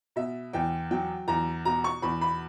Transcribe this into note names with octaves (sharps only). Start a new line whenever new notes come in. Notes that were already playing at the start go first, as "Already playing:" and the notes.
B2 E5
E2 G5
F#3 G5
E2 A#5
B2 A#5
C#6
E2 B5
B5